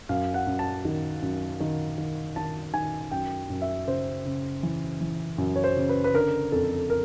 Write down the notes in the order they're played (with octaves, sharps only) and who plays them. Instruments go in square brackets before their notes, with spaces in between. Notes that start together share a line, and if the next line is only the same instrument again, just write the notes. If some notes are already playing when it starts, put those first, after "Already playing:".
[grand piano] F#2 F5
F#5
F#2
A5
D#3
F#2
D#3
D#3
D#3 A5
D#3 G#5
F#2 G5
F#2
E5
C#3 C5
C#3
E3
E3
F#2
C#5
C5
C#3
B4
B4
D3 A#4
F2 A4
A#4